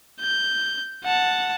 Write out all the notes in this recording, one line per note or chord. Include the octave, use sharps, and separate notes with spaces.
G6
F#5 A5